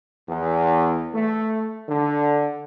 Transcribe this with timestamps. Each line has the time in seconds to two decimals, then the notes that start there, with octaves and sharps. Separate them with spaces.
0.28 E2
1.14 A3
1.88 D3